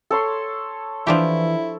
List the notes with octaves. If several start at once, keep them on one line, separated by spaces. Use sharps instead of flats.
A4 C#5 C6
E3 F3 D4 E4 G4